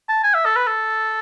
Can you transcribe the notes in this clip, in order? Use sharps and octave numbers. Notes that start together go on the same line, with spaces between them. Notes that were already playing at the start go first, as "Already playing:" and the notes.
A5
G#5
E5
A4
B4
A4